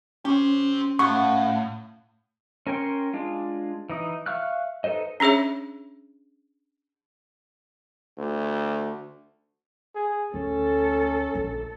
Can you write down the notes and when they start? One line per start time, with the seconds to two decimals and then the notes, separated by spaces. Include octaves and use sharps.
0.25 C#4 G4 C5 C#5
0.99 A2 F4 F#5 C#6
2.67 C#4 A#4 C#5 G5 C6
3.14 G#3 D4 F4
3.89 E3 D#4 D#6
4.26 E5 F5 C#6 F6 F#6
4.84 D#4 A4 B4 C5 D#5
5.20 C#4 D4 G#4 C#5 E5
8.18 D2
9.95 G#4
10.34 D2 C#4 A4
11.35 A#1